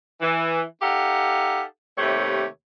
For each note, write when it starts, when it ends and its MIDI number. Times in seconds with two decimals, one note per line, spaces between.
0.22 0.60 52
0.82 1.62 63
0.82 1.62 67
0.82 1.62 69
0.82 1.62 77
0.82 1.62 78
1.98 2.45 39
1.98 2.45 48
1.98 2.45 57
1.98 2.45 67
1.98 2.45 73